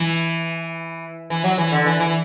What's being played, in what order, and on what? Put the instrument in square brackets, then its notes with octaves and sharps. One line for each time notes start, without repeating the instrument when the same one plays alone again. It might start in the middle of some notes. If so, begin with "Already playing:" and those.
Already playing: [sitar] E3
E3
F#3
E3
D3
E3
E3